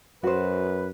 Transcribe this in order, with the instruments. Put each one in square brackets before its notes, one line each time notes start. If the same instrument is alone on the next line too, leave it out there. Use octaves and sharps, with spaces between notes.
[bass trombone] F#2 [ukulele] F#4 C5 [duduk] B4